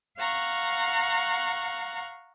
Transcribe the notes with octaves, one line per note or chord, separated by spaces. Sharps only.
F5 F#5 A#5 C#6